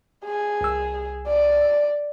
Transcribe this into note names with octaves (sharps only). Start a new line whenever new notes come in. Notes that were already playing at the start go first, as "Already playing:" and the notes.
G#4
C2 E6
D5